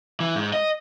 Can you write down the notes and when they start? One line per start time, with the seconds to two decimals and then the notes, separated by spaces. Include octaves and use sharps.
0.20 E3
0.36 G#2
0.53 D#5